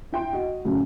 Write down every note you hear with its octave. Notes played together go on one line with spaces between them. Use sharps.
E4 G5 C6
F#4 D#5
F#2 A2 C#3